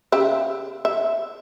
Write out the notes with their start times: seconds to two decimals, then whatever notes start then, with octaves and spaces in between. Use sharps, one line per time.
0.12 C#3 G4 E5
0.85 E5